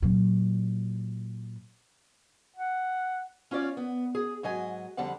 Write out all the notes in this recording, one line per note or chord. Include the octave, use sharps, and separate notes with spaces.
A#2 F#3
F#5
C#4 F4 C#5 D5
B3
G#4
G#2 F#3 D#5 G#5
F2 D3 G3 D5 F#5